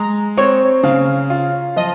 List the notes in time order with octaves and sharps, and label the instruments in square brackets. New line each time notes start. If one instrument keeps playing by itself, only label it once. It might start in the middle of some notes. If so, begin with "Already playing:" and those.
Already playing: [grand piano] G#3 [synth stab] A#5
[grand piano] C4 [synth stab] C#5
[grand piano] C#3 [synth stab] F5
[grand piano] F4
[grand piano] F3 [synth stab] D#5